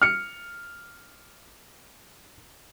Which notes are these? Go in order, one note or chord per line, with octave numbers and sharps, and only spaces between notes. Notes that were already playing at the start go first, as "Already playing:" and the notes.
F6 C#7